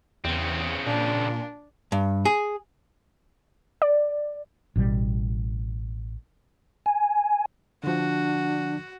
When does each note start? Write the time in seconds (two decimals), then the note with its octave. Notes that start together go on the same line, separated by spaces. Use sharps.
0.24 E2 C#3 C4
0.86 A#2 D4
1.92 G2
2.25 G#4
3.82 D5
4.76 A1 B2 D3 G3
6.86 G#5
7.84 D3 F3 D4 F#4